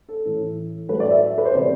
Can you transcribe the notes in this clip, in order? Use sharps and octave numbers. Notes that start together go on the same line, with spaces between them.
A4
A2 E3 A3
A2 F#3 A3 B4
D5
E5
B4
C5
C3 E3 B3 D5